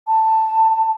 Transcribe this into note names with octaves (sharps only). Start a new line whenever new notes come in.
A5